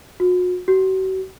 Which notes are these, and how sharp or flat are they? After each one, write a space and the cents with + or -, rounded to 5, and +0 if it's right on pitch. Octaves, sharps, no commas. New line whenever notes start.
F#4 -40
F#4 +40